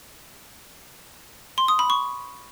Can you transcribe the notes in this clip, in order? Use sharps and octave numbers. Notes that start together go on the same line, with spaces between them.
C6
D#6
B5
C#6